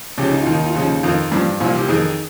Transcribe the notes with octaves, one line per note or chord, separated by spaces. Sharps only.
C#2 C#3 F3 G4
D#4
D#2 D#3 F4
D#4
F4
D#2 C#3 F3 D#4
F2 D#3 F4
G2 F3
C2 A#2 F3 F4
G4
F2 D#3 G#4